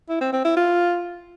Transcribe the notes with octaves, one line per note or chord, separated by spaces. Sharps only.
E4
C4
C4
E4
F4